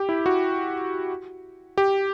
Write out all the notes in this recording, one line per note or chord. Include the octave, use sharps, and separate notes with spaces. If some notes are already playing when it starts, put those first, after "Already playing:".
Already playing: G4
E4
F#4
G4